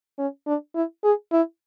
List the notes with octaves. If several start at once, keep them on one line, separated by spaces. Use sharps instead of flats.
C#4
D4
E4
G#4
E4